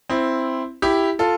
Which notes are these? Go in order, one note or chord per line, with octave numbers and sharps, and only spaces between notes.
C4 E4
E4 G4
F4 A4